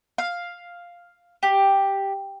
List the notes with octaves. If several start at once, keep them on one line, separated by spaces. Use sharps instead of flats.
F5
G4